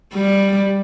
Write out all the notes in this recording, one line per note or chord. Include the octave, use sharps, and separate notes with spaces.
G3